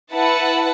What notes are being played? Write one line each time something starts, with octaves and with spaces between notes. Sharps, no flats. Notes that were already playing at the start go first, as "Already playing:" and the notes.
E4 B4 F#5 A5